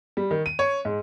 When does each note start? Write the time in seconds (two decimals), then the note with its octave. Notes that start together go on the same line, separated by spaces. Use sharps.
0.17 G3
0.31 D#3
0.46 D#7
0.59 C#5
0.85 G#2